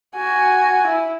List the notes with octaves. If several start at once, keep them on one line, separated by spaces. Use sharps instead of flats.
F#4 G#5
E4